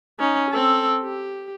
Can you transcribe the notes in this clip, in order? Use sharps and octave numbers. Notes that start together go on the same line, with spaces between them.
C#4 D#4
C4 A4
G4